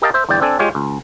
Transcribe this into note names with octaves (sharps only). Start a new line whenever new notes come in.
G4 A#4 D#5 F5 G5 A5
C5 E5
G1 E2 D5 G5
C4 D4 A4 G#5
G#3 F4 G4 C#5
C#2